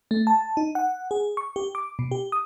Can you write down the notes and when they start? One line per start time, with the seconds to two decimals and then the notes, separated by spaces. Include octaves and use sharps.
0.11 A3
0.27 A5
0.57 D#4
0.75 F#5
1.11 G#4
1.37 C#6
1.56 G4
1.75 D6
1.99 B2
2.11 G4
2.32 D#6